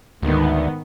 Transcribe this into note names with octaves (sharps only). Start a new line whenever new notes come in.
D2 G#2 D#3 B3